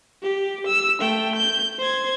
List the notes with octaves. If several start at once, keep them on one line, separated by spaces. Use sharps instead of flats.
G4
E6
A3 G5
G6
C5 G#6